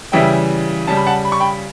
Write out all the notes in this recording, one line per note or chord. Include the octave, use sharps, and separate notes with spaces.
C#3 E3 G3 E5 G5
C#3 G3 A5
B5
F#5 A5
B5
C#6
G5 B5